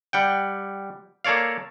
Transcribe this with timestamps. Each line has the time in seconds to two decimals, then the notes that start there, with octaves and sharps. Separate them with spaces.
0.13 G3 F#5 G5
1.24 A#3 A4 C#5 D5 F5